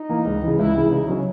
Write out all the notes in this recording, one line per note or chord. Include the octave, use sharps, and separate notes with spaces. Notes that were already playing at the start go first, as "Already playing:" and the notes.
Already playing: D#4
E3 A#3
C#2
C#3 E3
C#2 E4
C#3 E3
C#3 D#4
F#3 C#4